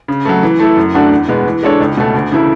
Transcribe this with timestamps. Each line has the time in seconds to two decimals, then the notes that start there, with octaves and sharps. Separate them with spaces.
0.08 C#3
0.25 F#3 A3
0.43 E3
0.60 A3 E4 A4
0.77 F#2
0.93 D3 A3 D4 F#4
1.11 E2
1.28 B2 G#3 B3
1.46 E3
1.63 G#3 D4 A4 C#5
1.80 C#2
1.97 B2 A3
2.14 D2
2.32 C#3 E3 A3 E4